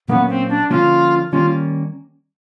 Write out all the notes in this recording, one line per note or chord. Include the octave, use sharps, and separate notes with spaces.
A#2 F#3 A#3 B3 C#4
C4
D4
D3 F3 A#3 C#4 F4
D#3 G3 A#3 C#4 F4